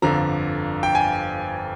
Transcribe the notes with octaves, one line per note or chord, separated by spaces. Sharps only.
G1 F2 D3 F3 A#5
G5
G#5